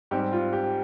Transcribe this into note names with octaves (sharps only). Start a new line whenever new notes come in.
G#2 G3 C4 G4
F4
G4